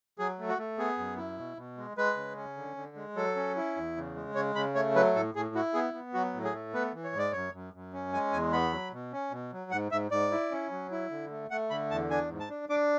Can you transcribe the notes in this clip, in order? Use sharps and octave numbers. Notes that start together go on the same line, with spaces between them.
F#3 G#4
A3
F#4
A3
B3 G#4
F#2
E4
B2
B2
G#3
G#3 B4
C#3
C#4
D3
D3
G#3
F#3 A4
C#4
E4
E2
C#3
G#3
C#3 C#5
C#3 B5
A3 C#5
F#3 B4
A2 A4
A2 G#4
E4 F#4
B3 G#4
B3
F#3 F#4
A2
G#4
A3
B3 B4
E3
C#5
G#2
D5
F#2 C#5
F#2
F#2
C#4
G#3 G#5
E2 G#5
B3 B5
F#3
B2
C#4
B2
F#3
G#2 F#5
G#2 E5
G#2 D5
E4
C#4
F#3
E4
D3
A3
A3 F#5
D3 B5
E2 A5
D4 G#5
G#2
A5
D4
D4 D6